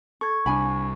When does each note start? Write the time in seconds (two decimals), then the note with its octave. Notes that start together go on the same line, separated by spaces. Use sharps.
0.21 A4 C#6 G#6
0.46 C2 D4 G#5 B5